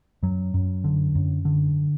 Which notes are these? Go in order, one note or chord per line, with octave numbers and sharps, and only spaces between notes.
F#2 F#3
F#2
D3
F#2
D3